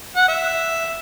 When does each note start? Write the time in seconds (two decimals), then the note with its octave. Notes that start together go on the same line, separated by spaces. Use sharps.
0.17 F#5
0.28 E5